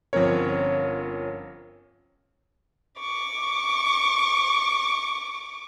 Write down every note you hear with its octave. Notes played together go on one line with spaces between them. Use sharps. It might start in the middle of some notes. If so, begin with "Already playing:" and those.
G1 F3 C4 C#4 A#4 C#5
C#6 D6